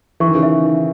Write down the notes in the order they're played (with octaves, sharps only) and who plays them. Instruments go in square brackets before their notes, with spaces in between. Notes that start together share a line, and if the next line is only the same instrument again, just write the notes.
[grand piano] E3 [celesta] C#6
[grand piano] D#3
C#3 E3
[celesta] E5
D#4